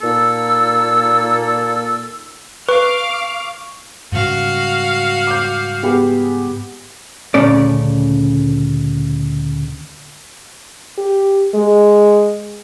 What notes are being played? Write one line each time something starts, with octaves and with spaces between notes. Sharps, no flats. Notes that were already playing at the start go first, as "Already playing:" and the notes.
A#2 A#3 D#4 A4 E6
B4 F5 C#6 D6 F6
G#2 C#3 G3 F#4 F5
D6 G6
B3 G4 G#4
D2 A#2 C#3 A3 C#4 D5
G4
G#3